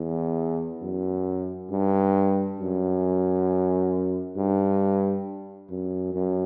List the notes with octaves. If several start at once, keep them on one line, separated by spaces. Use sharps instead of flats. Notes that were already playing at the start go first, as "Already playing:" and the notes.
Already playing: E2
F#2
G2
F#2
G2
F#2
F#2